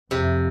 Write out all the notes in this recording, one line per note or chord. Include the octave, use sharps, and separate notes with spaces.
F2 C3